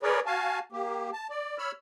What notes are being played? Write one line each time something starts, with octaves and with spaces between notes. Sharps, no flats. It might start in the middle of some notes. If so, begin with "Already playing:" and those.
G#4 A#4 B4 C#5 D5
F#4 F5 G#5 A5
A#3 G4
A5
D5
C#5 B5 E6 F6